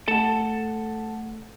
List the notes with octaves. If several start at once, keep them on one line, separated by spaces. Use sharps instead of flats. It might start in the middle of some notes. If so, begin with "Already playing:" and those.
A3 A4 F#5 A5